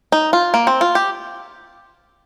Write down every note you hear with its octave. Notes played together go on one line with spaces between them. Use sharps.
D#4
F4
A#3
C4
F4
G4